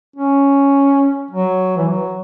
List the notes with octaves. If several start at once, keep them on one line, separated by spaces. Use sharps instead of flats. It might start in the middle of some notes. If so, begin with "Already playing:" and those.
C#4
F#3
E3
F#3